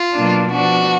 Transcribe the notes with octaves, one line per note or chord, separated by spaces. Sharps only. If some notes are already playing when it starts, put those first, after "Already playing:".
Already playing: F4
B2 F#3 A#3 D4
F3 B3 D4 F#4